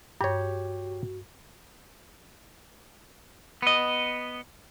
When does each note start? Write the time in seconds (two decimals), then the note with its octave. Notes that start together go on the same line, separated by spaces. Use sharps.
0.21 G2 F#4 G4 C#5
3.62 B3 D#5